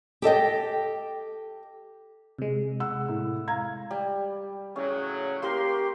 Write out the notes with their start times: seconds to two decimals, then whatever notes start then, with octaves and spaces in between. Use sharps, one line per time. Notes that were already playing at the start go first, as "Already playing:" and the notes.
0.22 G4 A4 D#5 G5
2.39 C3 G#3
2.80 F#5 E6
3.08 A2
3.48 F5 A#5 G#6
3.91 G3
4.76 A2 C#3 F#3 C#4
5.42 A#3 G4 A#4 C6